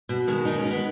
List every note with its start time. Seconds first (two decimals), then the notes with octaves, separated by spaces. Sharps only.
0.09 B2
0.28 D#3 G#3
0.45 D#3 D#4
0.58 C#4
0.66 D#3 B3